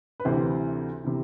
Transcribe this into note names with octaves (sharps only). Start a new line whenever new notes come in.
B4
D2 C3 E3 C5
C3 E3